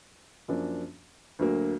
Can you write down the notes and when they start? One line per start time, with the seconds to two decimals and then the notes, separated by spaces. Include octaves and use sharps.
0.48 F#2 F3 A#3 D4
1.39 D2 D3 F#3 A#3